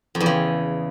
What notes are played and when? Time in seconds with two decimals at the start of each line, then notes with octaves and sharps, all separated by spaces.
0.15 F2
0.20 E2
0.26 C#3